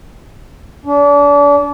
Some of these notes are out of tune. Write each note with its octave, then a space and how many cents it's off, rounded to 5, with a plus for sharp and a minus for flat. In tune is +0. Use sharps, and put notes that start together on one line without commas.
D4 -35